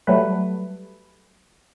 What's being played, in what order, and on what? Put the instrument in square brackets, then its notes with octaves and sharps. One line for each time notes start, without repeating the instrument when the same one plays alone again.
[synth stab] F#3 G3 A3 B4